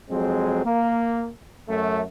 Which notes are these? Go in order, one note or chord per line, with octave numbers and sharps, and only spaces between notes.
F2 F#3 G#3 C4
A#3
F#2 A3